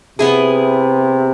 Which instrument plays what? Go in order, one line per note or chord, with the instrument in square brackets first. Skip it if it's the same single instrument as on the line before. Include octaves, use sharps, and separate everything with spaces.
[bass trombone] C3 [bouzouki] B3 E4 G#4